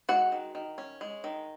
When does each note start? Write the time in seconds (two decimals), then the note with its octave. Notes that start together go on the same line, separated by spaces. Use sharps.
0.09 G#3 F#4 F#5
0.32 D#3
0.55 D#3
0.78 C#4
1.01 G#3
1.24 D#3